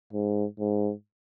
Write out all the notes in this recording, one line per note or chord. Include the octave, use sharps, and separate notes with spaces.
G#2
G#2